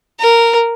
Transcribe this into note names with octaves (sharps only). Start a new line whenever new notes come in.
A#4